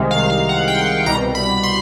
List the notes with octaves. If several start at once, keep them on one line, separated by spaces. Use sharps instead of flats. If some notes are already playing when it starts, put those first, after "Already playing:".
Already playing: C2 C3 D#3 G#3
F5
F5
F#5
G5
C2 B2 G3 A#5
B5
C6